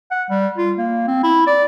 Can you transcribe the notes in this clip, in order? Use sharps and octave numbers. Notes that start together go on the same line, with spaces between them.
F#5
G3
F4
A#3
C4
E4
D5